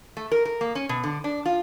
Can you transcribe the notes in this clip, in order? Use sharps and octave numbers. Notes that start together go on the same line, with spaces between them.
A3
A#4
A#4
A#3
C#4
B2
D3
D4
F4